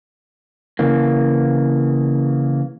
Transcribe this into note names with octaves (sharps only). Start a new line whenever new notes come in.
C#3 E3 A#3